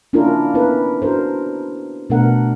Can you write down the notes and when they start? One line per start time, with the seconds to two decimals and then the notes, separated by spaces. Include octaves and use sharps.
0.13 A#3 C#4 D4 E4 F4 A#4
0.54 B3 C#4 E4 A#4 B4
1.02 D4 F#4 A#4 C5
2.10 B2 A3 B3 D4 A#4 F#5